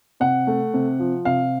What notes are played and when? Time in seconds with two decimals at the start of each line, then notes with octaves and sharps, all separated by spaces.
0.20 C3 F#5
0.47 A3
0.74 C3
0.99 F3
1.25 C3 F5